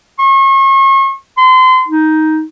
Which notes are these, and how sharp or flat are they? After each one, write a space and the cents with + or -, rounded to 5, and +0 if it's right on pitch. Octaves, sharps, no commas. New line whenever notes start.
C#6 -40
C6 -30
D#4 +10